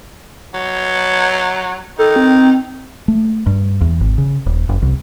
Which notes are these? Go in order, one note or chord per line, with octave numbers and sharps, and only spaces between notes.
F#3
D#3 A4
C4
A3
G2
E2
G#1
C#3
D#1
F#1
C2